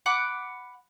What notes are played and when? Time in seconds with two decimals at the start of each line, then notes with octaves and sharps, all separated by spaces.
0.06 F#5 B5 D6 F#6